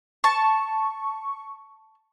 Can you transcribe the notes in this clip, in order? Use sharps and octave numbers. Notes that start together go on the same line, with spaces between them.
A5 C#6